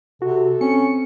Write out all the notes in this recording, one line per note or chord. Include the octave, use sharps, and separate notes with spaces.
C3 F#4 A4
C4 C#4 C#7